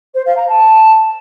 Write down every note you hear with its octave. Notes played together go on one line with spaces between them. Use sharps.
C5
F5
A#5
A5